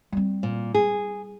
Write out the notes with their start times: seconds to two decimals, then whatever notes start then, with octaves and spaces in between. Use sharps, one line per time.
0.12 G3 C4
0.43 A#2
0.74 G#4